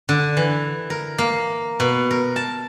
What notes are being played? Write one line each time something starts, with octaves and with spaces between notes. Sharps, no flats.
D3
E3
A#4
A#3
B2
A#4
A5